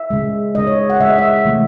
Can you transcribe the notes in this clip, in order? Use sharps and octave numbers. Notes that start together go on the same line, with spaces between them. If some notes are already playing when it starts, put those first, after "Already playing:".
Already playing: E5
C#3 G#3
C#3 G#3 D#5
C#5
F#5
C#3 G#3 E5
D#5
E5
C3 E3 A3